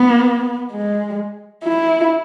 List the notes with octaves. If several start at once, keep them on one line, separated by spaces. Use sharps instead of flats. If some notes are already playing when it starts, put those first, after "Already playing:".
Already playing: B3
G#3
E4